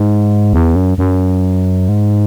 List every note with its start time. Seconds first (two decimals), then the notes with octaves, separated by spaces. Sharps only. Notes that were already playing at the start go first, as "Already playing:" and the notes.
Already playing: G#2
0.53 E2
0.76 F#2
0.98 F#2
1.89 G#2